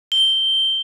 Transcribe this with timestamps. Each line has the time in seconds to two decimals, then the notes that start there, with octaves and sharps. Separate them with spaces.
0.12 G7